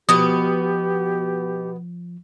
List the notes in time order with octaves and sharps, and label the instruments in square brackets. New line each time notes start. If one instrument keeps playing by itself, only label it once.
[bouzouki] B2 B3 [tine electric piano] F3 [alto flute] G4 [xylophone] D#6